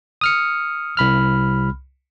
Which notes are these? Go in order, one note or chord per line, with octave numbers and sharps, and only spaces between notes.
D#6 F6 C#7
C2 B5 F6